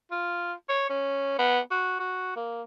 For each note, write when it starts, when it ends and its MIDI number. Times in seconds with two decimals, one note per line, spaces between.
0.12 0.53 65
0.69 0.88 73
0.90 1.37 61
1.39 1.60 59
1.71 1.96 66
2.00 2.32 66
2.36 2.62 58